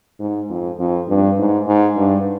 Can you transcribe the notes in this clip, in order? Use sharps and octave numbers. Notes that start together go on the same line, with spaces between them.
G#2
F2
F2
G2
G#2
G#2
G2